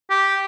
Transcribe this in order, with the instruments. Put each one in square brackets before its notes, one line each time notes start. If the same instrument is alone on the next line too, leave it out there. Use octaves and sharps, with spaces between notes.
[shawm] G4